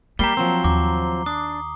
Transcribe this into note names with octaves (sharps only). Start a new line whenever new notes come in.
G3 A#3 G4 A#5 C7 G7
F3 F#3 C4
D#2 D6
D4 D#6